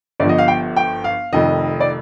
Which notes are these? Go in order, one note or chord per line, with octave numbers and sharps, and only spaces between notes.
G1 G2 F3 D5
D#5
F5
G5
G5
F5
F1 F2 D#3 D#5
D5